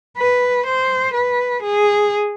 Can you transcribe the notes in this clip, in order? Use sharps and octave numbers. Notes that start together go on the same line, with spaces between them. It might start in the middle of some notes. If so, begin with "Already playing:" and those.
B4
C5
B4
G#4